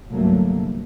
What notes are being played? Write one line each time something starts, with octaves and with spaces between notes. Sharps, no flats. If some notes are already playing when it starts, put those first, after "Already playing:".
G1 C2 F#3 A3 A#3